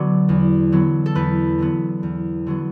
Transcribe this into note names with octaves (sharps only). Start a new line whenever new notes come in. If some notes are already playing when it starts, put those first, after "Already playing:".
Already playing: D3 F#3 B3 D5
E2
D3 F#3 B3
A4
E2 B4
D3 F#3 B3
E2
D3 F#3 B3